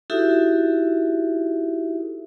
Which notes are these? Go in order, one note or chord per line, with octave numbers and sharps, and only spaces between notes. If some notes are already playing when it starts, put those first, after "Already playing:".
D#4 E4 F#4 G4 A4 E5